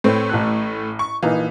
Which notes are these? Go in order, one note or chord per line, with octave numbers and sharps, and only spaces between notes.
A2 A3 C4 B4 C#5
A1 A4 F#6
C#6
A#1 E3 D#4 F5